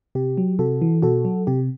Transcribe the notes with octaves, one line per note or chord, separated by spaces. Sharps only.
C3 G4
F#3
C3 F#4 A4
E3
B2 F#4 A4
F#3
C3 G4